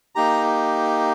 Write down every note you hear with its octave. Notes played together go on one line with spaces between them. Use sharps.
A#3 D#4 G4 A#5